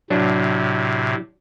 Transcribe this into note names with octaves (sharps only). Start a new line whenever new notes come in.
A2 C3 F#3 D4